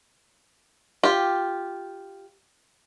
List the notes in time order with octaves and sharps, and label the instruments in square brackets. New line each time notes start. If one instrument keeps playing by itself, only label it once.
[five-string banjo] F4 G4